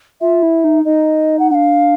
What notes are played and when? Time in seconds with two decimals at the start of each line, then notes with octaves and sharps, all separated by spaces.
0.21 F4 E5
0.43 E4
0.64 D#4
0.85 D#4 D#5
1.39 F#5
1.51 D4 F5 F#5